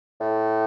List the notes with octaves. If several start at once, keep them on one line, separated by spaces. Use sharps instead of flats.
A2